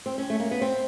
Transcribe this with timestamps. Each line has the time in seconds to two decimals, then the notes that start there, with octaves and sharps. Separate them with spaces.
0.06 C4
0.18 C#4
0.30 A3
0.39 A#3
0.51 B3
0.62 C4